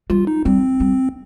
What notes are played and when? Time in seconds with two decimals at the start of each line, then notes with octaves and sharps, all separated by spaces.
0.10 G3 F4
0.27 D#4
0.45 G3 C4
0.80 G3